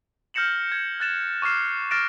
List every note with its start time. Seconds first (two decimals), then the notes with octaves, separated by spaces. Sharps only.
0.34 F6 G6 A#6 C#7 E7 F#7
0.72 G#6
1.00 F#6 A6 E7
1.42 C#6 D6 F6 C7 E7
1.91 F6 A6 A#6 D7 E7